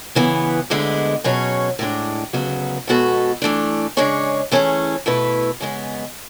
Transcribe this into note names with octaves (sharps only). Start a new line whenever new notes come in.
C#3 E3 B3
D2 D3 G#3 B3 E4
B2 F#3 C#4 G#4 C#5
A2 G#3 D4
D2 C#3 F#3 B3
B2 G#3 B3 F#4 A4
E3 A3 D4
C#3 G#3 D4 G#4 C#5
E3 A3 C#4 G#4
B2 A3 E4 B4
C#3 G#3 B3